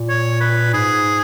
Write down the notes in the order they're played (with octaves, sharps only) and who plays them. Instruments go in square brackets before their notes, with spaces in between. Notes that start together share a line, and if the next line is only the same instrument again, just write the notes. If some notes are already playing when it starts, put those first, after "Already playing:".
Already playing: [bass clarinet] A#2
[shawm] C#5
B4
[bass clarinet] G#2 [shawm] G#4